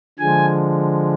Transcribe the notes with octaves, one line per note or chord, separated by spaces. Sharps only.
D3 F3 G#3 G#5